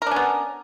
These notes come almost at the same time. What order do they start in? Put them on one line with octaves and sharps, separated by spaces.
A#4 D4 C#4 B3